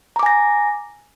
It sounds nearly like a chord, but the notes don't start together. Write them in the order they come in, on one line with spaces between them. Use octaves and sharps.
A#5 D6 G#5 A#6